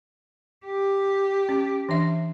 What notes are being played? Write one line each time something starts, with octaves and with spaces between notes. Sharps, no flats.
G4
C#4
E3 D4 E5